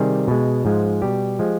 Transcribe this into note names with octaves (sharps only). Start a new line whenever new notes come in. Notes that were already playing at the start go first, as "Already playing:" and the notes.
Already playing: C3 D#3 G3 G#4
B2 G#3
G#2 F3 G#3
B2 G3 G4
F3 G#3